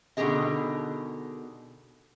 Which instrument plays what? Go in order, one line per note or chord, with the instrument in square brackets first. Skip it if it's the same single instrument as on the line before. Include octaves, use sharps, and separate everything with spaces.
[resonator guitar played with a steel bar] B2 D3 D#3 G4 G#4 D#5